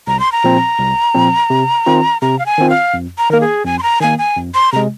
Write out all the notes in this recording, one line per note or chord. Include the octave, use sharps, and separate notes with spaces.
C2 A#5
C6
A#5
A#2 F3 C4
C2
A#2 F3 C4
C3
D#3 C4 F4
C3 A#5
F5
G#5
D#3 C4 F4
F5
F2
A#5
D#3 A#3 A#4
G#4
F2 G#5
C6
A#5
D#3 A#3 G#5
G#5
F2
C6
C3 G#3 A#5